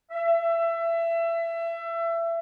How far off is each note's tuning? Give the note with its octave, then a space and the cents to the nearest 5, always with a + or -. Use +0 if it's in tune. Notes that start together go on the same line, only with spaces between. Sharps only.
E5 +25